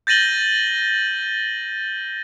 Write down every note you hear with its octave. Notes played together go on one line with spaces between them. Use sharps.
G6 A6 A#6 D#7 F#7 G7